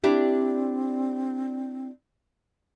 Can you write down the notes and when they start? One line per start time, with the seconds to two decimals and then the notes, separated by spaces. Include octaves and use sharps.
0.04 C4 D4 E4 G4